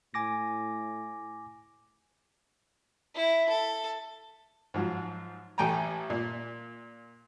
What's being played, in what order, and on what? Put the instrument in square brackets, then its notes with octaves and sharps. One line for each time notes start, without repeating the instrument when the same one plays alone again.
[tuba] A2 [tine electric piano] G#5 D6 A#6
[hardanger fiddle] E4
A4
[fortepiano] G#2 F3 F#3
A1 A3 G5 G#5 A#5
A#2